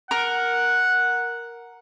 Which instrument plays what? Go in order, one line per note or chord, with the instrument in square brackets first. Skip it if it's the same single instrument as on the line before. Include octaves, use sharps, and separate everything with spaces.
[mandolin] A#4 [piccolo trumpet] F#5